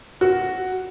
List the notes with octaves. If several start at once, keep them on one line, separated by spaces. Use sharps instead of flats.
F#4